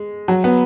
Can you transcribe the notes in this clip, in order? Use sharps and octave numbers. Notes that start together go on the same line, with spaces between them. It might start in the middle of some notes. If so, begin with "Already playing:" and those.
Already playing: G#3
F#3
B3